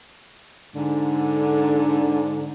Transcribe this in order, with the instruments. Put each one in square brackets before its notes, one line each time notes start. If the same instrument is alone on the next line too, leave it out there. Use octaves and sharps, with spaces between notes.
[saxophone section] G#2 D3